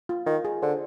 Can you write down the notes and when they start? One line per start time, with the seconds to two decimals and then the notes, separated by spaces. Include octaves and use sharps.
0.09 F4
0.27 D#3 F4
0.45 G#4
0.62 D3 C5